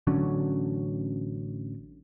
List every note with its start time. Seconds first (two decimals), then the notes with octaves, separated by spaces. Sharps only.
0.07 A1 D3 F#3 C#4